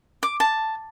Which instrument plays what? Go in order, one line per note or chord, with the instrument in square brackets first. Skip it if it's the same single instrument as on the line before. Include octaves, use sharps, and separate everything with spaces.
[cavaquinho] D6
A5